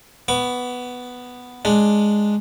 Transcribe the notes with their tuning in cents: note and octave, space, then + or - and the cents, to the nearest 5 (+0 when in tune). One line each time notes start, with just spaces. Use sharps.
B3 +0 C#6 +45
G#3 +0 D4 +0